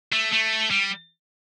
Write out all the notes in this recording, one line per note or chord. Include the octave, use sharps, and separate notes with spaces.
A3
A3
G3